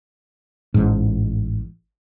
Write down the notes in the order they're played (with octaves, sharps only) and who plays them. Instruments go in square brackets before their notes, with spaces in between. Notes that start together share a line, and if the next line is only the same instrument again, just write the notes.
[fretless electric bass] A1 G#2